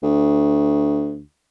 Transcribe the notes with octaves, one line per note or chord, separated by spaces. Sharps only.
D2